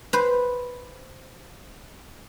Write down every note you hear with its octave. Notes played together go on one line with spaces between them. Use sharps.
B4 C5